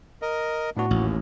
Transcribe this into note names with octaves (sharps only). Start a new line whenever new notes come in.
A#4 D#5
A2 B3 D4 F#4
A1 D#2